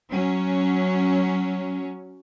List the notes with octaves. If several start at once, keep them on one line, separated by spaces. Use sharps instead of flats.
F#3 C#4